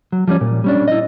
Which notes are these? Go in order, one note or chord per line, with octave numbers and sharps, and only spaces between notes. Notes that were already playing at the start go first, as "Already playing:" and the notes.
F#3
F3 G3 B3 C#4
A#2
G3 C#4 D4
E4 D#5